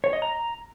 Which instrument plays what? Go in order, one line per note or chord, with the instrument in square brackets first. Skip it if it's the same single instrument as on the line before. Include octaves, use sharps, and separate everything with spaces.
[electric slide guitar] C#5
D#5
A#5